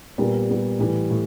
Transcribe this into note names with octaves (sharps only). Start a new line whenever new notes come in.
A#2 G3 B3
A#2 G3 B3
A2 E3 G3
A2